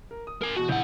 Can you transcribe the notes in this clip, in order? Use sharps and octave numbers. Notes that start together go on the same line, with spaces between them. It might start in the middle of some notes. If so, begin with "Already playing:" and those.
A#4
D#6
A#4 G#5
E2 B2 F#4
A#1 C#3 E4 F#5 G6